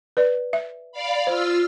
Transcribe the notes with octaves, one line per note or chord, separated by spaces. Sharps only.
B4 D5
E5
D5 F5 B5
F4 C5 E6 F6